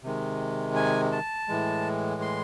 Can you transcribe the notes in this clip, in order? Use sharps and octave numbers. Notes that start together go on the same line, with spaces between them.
C3 D#3 G#3
G#5
A5
A2 E3 G#3
C6